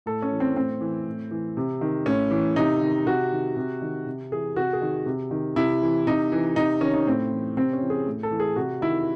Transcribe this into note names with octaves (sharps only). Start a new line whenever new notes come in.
A2 A4
C#4
E3
C4
A2 C4
E3
A2
E3
C3
D#3
A2 C#4
E3
C3 D#4
D#3
C3 F#4
D#3
C3
D#3
C3
E3 G#4
C3 F#4
G#4
D#3
C3
D#3
C3 E4
E3
C3 D#4
E3
C3 D#4
D#3 C#4
D#4
A2 C4
E3
C3 C4
C#4
E3
G#4
A2
A4
E3
G#4
C3 F#4
D#3 E4